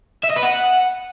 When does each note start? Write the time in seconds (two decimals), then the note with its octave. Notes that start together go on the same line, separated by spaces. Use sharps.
0.23 E5
0.30 D#5
0.36 B4
0.43 F#5